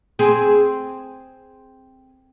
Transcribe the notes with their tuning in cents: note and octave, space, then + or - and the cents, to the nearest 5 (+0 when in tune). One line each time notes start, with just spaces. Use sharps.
C4 +0 G#4 +0